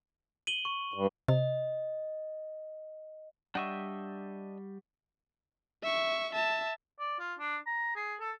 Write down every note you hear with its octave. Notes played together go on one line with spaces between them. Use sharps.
D#7 F#7 G7
C#6
G2
C3 D#5
G3 D4 D#5 E5 F#5 G5 C#6
E5 C#6
E5 A5
D5
F4
D4
A#5
G#4
A4